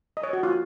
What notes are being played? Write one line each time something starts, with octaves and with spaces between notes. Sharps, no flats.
D#5
C#5
F#4
F4